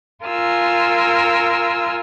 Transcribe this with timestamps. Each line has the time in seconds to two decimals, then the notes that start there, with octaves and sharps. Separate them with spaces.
0.24 F4 A#4 G#5 E6 F6